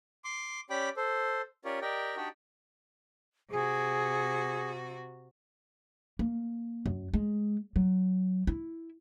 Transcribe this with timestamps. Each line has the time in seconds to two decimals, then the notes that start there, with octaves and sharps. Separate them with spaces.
0.24 C6 D6
0.70 C#4 G4 D5 G5 B5 D6
0.97 A4 C5
1.65 C#4 F4 G4 A#4 C#5 D5
1.82 G4 A#4 D5 D#5 G5
2.17 D4 D#4 F#4 G4 D5 G5
3.51 C3 F#4 G#4
6.19 A#3
6.86 F#2
7.14 G#3
7.76 F#3
8.47 E4